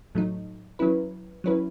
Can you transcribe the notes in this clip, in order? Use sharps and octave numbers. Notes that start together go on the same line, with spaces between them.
A2 F#3 A3 D#4
F#3 C#4 E4 B4
F#3 C#4 E4 B4